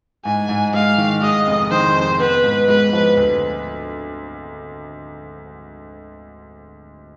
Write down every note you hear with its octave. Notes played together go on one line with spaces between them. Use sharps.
G#2 G#5
G#2
G#3 F5
D#3
G#3 D#5
F1
D#3 C5
F2
B3 B4
G#2
G#3 B4
F3
D2